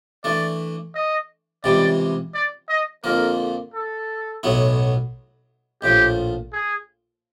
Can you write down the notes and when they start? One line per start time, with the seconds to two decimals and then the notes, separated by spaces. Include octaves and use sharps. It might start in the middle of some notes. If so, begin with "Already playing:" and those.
0.24 E3 A3 D4 D5
0.95 D#5
1.64 C#2 C3 E3 G3 D5
2.34 D5
2.69 D#5
3.04 F2 D3 F3 A#3 A#4
3.73 A4
4.43 B1 A2 F#3 B3 E4
5.82 A#1 A2 F3 G4
6.52 G#4